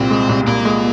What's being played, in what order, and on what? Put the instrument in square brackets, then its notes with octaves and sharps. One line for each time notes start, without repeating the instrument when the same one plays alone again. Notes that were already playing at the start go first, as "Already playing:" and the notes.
Already playing: [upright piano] C2 A#2 [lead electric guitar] C4
[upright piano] G#3
C2
[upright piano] C2 [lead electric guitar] A#3
[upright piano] G#3